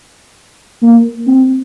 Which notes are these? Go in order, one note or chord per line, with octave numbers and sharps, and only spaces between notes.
A#3
C4